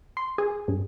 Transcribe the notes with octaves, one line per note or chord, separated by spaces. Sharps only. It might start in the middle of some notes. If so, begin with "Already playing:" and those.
C6
G#4
G2